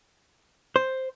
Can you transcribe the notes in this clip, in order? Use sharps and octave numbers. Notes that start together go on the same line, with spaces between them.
C5